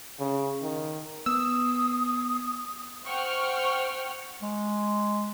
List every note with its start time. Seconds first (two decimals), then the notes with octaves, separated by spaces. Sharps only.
0.20 C#3
0.62 D#3
1.26 B3 D#6 E6
3.06 C5 F#5 G5 C#6 F6
4.42 G#3